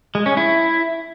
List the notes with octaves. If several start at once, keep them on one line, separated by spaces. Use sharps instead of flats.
G#3
C#4
E4